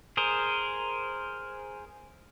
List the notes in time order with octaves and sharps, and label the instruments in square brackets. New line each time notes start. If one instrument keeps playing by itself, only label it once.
[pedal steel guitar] G#4 A#4 C5